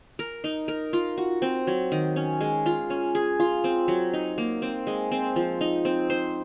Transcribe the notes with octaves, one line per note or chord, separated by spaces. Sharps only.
A#4
D#4
A#4
F4
F#4
C4
F#3
D#3
C#4
G#3
F4
C#4
G#4
F4
C4
F#3
D#4
A#3
C4
G#3
C4
F3
D#4
C4
C5